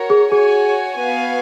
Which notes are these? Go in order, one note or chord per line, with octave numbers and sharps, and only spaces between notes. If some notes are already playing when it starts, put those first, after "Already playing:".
Already playing: F#4 A#4 C#5
G#4
F#4 G#4 C#5 G#5
B3 F#4 B4 F5 G#5